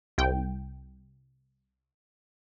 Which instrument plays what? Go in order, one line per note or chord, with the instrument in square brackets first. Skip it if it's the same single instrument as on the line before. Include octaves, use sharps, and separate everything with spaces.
[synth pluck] C2 G5